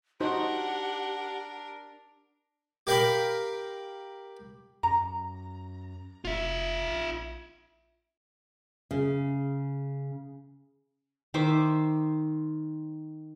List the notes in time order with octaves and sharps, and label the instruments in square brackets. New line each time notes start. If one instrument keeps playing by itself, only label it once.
[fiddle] D4 A#4 [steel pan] D#4 F#4 C5 [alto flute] G4 [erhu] F#5
[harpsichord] G4 A#4 F5 G5 B5
[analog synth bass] F#2 [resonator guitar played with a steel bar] A#5
[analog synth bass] F1 [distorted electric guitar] F4 E5
[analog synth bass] A#1
[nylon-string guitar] C#3
[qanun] D#3 C5 E5 D6